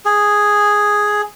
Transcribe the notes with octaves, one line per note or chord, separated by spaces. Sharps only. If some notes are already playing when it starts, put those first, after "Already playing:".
G#4